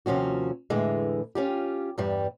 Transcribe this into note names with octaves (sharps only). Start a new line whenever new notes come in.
D#2 C3 F3 C#4 F#4
E2 A2 D3 E3 G#3
C#4 F4 G4
E2 G2 G3